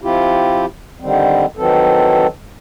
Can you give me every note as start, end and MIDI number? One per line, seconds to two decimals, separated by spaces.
0.01 0.66 53
0.01 0.66 60
0.01 0.66 64
0.01 0.66 65
0.01 0.66 67
1.00 1.46 50
1.00 1.46 51
1.00 1.46 55
1.00 1.46 60
1.57 2.27 51
1.57 2.27 52
1.57 2.27 54
1.57 2.27 60
1.57 2.27 69